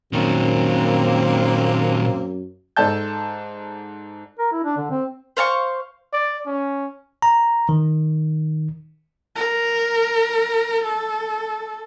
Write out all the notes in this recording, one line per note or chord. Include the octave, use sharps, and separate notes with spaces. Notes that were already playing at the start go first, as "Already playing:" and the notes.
F#2 A#2 D#3 A#3 C4
G#2 A4 D5 A5 G6
A#4
E4
D4
D3
C4
C5 F5 A5 C#6
D5
C#4
A#5
D#3
A#4
A4